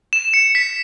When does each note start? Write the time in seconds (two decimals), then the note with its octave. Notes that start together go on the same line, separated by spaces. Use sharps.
0.13 E7
0.34 C#7
0.55 B6